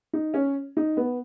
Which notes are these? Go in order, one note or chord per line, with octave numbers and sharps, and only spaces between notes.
D#4
C#4
D#4
B3